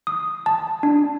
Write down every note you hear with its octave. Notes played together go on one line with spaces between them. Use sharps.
D#6
A5
D4